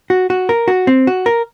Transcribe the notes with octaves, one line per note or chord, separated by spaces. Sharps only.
F#4
F#4
A#4
F#4
C4
F#4
A#4